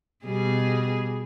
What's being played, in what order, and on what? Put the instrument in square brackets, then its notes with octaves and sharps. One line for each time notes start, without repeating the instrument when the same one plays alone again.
[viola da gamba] B2 G3 G#4